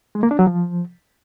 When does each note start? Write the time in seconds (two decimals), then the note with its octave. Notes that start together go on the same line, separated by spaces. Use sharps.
0.15 G#3
0.23 A#3
0.31 D4
0.39 F#3
0.47 F3